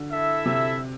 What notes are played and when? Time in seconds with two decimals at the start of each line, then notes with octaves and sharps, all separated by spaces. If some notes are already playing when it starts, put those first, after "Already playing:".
Already playing: D3
0.11 E4 A4 E5
0.46 C3